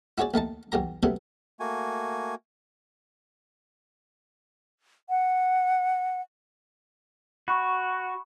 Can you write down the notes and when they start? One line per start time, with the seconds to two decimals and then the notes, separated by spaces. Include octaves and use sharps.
0.18 E4 F#4 G#4 C#5 D5
0.34 D#2 A3 D#4 A5
0.72 B1 E2 G4 A#5
1.03 C3 F#3 G3 A3 B3
1.60 A3 A#3 F#4 G#5
5.09 F#5
7.48 F#4 B5 C#6